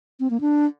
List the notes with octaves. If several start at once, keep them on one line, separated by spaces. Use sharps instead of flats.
C4
A#3
D4